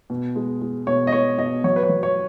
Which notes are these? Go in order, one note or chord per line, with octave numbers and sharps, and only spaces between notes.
B2
G#3
G#3
B2 C#5
D#5
G#3 C#5
B2 D#5
F#3 C#5
B4
C#5
F#3
C#5